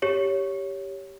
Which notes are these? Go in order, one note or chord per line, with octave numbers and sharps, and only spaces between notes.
G4 C#5